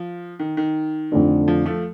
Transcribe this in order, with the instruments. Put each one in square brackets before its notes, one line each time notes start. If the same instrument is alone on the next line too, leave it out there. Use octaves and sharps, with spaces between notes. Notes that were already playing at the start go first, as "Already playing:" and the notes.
Already playing: [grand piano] F3
D#3
D#3
[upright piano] F2 D3 A3 D4
[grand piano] F3
F3 A3